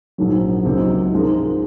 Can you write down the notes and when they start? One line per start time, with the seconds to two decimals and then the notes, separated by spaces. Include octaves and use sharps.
0.18 A#1 G#2 D#3 F#3
0.65 C#2 C3 F#3 A#3 D#4
1.12 G#2 F3 G#3 D#4 A#4